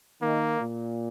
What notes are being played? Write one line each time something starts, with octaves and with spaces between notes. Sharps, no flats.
D#3 A#3
A#2